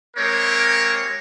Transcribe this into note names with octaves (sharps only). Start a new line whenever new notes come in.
G#3 A#3 C4 G4 A#4 C#5